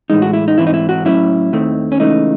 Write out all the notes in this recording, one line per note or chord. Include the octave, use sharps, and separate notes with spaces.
A2 E3 G#3 D#4
F#4
E4
D#4
G#2 E3 C4 E4
D#4
E4
F#4
A2 F#3 C#4 E4
D#2 D#3 A3 C4
C#4
C#2 C#3 E3 A3 D#4